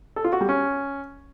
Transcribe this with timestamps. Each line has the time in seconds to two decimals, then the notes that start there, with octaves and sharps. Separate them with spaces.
0.16 A4
0.24 F4
0.33 F#4
0.41 G3
0.49 C#4